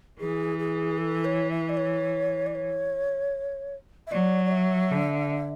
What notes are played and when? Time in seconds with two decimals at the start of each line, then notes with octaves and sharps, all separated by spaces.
0.20 E3 G#4
0.59 G#4
0.98 A4
1.25 C#5
1.51 E5
1.69 D5
1.77 C#5
2.46 D5
2.55 C#5
4.07 E5
4.12 F#3 D5
4.45 D5
4.51 E5
4.91 D3